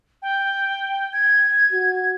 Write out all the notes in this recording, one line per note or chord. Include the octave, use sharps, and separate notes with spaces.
G5
G#6
F#4